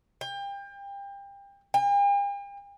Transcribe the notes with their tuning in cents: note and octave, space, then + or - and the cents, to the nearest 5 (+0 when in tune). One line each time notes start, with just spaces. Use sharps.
G5 +30
G5 +45